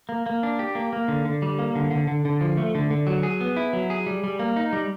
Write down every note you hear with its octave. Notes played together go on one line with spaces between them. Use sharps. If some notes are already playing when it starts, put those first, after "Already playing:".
A#3
A#3
D4
G4
A#3
A#3
D3
D3
G3
A#3
D3
D3
D3
D3
F3
A3
D3
D3
F#3
G#4
B3
E4
F#3
G#4
G3
G3
A#3
D#4
G3